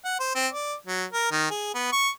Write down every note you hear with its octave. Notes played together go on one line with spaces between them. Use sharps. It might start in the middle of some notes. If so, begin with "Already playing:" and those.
F#5
C5
C4
D5
F#3
A#4
D#3
G#4
B3
C#6